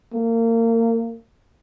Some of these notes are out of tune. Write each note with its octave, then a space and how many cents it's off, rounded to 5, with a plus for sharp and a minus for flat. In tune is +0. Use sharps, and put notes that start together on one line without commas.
A#3 -30